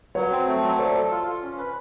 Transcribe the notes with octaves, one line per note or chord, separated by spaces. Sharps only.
F#3 B4 C#5
C4
A3
F#3
A4 C5 D5
A4
F4
F4
C#4
B4